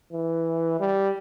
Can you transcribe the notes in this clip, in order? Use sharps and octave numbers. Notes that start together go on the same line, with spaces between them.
E3
G3